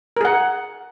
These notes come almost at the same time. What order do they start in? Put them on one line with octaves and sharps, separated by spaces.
A#4 G#4 F#5